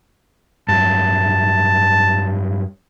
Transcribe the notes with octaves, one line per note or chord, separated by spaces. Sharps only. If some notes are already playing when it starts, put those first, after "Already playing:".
G2 F#3 A5